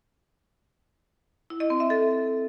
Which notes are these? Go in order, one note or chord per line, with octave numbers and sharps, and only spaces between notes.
E4
D#5
C4
E5
A4